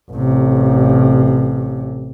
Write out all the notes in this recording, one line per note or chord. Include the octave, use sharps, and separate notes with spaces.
A1 C3